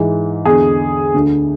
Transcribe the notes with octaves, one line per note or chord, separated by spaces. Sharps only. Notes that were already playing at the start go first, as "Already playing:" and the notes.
Already playing: G#2 E3
E2 D3 G#4
D2 D3